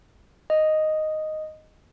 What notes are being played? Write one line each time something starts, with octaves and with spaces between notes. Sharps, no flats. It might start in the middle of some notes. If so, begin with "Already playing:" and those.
D#5